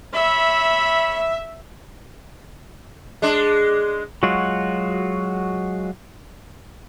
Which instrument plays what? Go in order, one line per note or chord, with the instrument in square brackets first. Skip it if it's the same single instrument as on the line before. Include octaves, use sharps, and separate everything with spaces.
[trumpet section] C#5 B5 [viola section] E5
[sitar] G#3 D4
[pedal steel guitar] F#3 G#3 F4 F#4